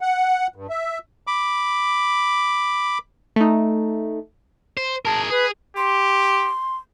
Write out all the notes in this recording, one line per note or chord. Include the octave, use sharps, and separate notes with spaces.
F#5
G2
E5
B5 D6
A3 D#4
C5
G#4 A#4 A5
G#4 B4
G4 C6